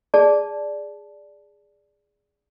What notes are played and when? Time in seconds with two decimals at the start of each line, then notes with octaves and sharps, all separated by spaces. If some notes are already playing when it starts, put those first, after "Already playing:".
0.14 G#4 D5 A5